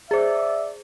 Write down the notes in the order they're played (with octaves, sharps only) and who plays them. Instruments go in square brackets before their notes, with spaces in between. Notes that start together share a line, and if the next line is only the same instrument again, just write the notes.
[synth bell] G#4 C5 [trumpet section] D5 E5